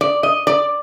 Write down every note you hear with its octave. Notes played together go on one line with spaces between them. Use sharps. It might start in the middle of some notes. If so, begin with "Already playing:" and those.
D5
D#5
D5